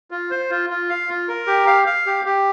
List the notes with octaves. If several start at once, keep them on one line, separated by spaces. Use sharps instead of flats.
F4
C5
F4
F4
F5
F4
A#4
G4
F5
F5
G4
G4